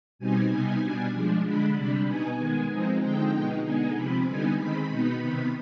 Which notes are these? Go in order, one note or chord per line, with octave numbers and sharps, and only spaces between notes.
B2 G3 C4 D#4 G#5
C3 G3 B3 D#4
B2 G3 D4
F3 G#3 D4
D3 G#3 D4 B5
C3 G3 D4 B5
B2 B3 D#4 G#5
D#3 G#3 B3
F3 G#3 C4 D#4
D3 F3 G#3 C4 D#4 G5
B2 G#3 B3 D#4
D3 G#3 B3 D#4 G#5
C3 F3 C4 B5
D3 G3 B3 D#4 G#5
D#3 G#3 C4 B5
B2 B3 D#4
C3 D#3 B3